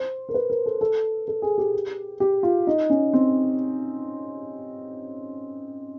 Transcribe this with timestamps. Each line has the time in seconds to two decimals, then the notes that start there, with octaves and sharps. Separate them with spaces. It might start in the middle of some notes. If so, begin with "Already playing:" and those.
Already playing: C5
0.29 A#4
0.34 B4
0.50 A#4
0.66 A4
0.81 A4
1.28 A4
1.42 G#4
1.58 G4
2.20 G4
2.43 F4
2.67 D#4
2.90 C#4
3.13 C4